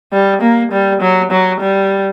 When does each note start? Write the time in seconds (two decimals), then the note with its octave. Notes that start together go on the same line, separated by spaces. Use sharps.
0.13 G3
0.41 A#3
0.72 G3
1.01 F#3
1.31 F#3
1.60 G3